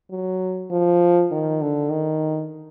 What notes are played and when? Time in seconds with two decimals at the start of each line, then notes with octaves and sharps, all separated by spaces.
0.11 F#3
0.71 F3
1.31 D#3
1.61 D3
1.91 D#3